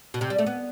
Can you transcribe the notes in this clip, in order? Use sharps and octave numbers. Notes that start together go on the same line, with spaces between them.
B2
C3
G3
A3
B3